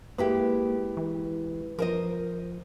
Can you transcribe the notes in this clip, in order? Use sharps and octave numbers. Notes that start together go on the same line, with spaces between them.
G#3 A#3 E4 G4 B4
E3
F3 A#4 C5 D#5